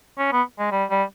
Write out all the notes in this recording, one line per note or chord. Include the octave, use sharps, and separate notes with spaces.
C#4
B3
G#3
G3
G3